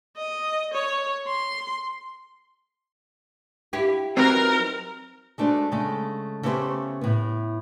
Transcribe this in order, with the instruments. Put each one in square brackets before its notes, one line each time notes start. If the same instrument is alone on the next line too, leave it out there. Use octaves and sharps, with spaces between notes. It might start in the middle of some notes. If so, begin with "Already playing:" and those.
[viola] D#5
C#5
C6
[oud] E4 G4
[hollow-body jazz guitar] F#3 C4 [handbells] D#4 B4 A#5 [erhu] A#4
[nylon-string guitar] G#3 A3 D4 F#4 C5
C#3 G#3 A3
C#3 A3 B3 C#4 G4 C5
A2 B3